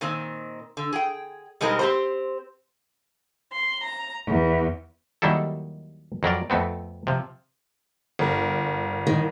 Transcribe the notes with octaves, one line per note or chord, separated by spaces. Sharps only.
A#2 D#3 C4
D3
G#4 G5
B2 G3 G#3 C4 D#4 A#4
C4 G4 C5
C6
A#5
E2
D#2 D#3 F#3 G3 E4 A4
F2 F#3 A#4 D5
F2 A3 B3 C4
C3 F3
G1 A#4
D#3